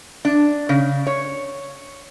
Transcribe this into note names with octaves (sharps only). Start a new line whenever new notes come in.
D4
C#3
C#5